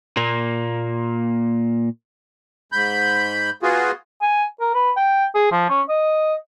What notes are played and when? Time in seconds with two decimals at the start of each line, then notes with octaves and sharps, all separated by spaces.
0.17 A#2 A#3
2.72 G#2 B5 G6
3.63 B3 F4 F#4 G#4
4.22 G#5
4.60 A#4
4.74 B4
4.97 G5
5.35 G#4
5.52 F3
5.69 C#4
5.89 D#5